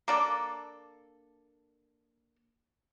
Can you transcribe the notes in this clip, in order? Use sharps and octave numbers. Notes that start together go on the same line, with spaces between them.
A#3 D4 A4